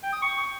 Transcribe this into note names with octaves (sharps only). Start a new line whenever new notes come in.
G5
D#6
C#6